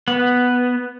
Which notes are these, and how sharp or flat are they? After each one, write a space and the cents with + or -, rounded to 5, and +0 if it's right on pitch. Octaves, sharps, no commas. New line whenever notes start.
B3 +0